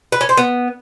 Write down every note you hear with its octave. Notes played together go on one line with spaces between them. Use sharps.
B4
C#4
C5
B3